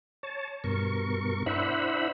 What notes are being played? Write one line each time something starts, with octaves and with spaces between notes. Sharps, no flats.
C#5 A5
G2 B2 A#4 C#6
D4 E4 C5 E5 F#5 B5